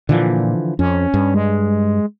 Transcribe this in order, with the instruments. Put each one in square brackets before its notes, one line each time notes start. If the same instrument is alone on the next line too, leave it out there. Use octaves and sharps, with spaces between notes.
[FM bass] A#2 [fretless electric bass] D3 E3 F3
[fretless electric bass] F2 [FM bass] C#4
[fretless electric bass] G2
[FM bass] G#3